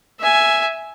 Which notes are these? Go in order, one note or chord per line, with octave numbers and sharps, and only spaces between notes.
E5 G#5